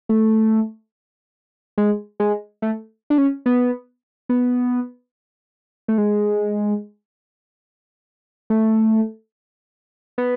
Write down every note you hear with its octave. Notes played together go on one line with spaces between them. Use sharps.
A3
G#3
G#3
A3
D4
C#4
B3
B3
A3
G#3
A3
B3